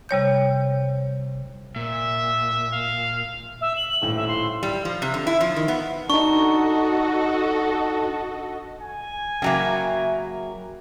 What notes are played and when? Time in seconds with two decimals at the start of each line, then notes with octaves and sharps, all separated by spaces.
0.09 C3 G3 C#5 G6
1.76 A#2 E5
2.73 F5
3.61 E5
3.77 F#7
3.89 F#7
4.02 D#1 A2
4.16 E5
4.28 C6
4.63 G3
4.85 F3
5.02 C3
5.14 D3
5.27 E4
5.41 F3
5.56 D#3
5.68 B3
6.10 D4 D#4 F#4 A4 D#5 C#6
8.82 G#5
9.42 C#3 F#3 A#3 E5 G5